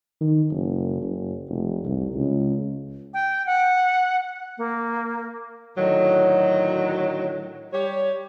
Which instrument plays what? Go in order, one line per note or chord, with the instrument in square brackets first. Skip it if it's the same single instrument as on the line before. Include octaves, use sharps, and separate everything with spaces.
[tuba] D#3
F#1
F#1
F1
C2
C#2
[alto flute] G5
F#5
A#3
[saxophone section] A2 D3 D#3 F#3
G3 G4 C#5